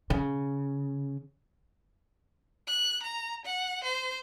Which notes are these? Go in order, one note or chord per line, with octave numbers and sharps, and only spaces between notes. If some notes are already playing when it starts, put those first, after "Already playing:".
C#3
F#6
A#5
F#5
C5